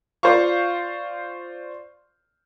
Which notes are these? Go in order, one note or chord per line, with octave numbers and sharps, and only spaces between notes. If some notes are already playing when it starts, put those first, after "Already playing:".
F4 C5 D5 F5 C#6